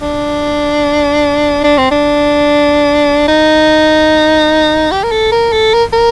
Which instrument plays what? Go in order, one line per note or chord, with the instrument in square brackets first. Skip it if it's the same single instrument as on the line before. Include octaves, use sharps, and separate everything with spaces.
[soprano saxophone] D4
D4
C4
D4
D#4
G4
A#4
A4
A#4
A4
A#4
A#4